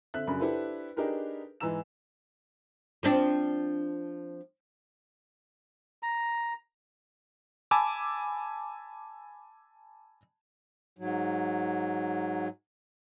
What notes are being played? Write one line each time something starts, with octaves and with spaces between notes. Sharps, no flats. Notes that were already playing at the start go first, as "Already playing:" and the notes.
D3 C4 E5 F#6
F#2 C#3 D4 A#4 B5
D4 E4 G4 A4 B4 C5
D4 D#4 G4 G#4 A#4 B4
G#2 E3 B4 A#5 E6 E7
F3 C4 D4
A#5
G#5 A5 B5 D6 E6
G#2 F#3